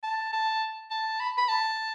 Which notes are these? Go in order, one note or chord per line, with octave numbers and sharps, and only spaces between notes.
A5
A5
A5
B5
B5
A5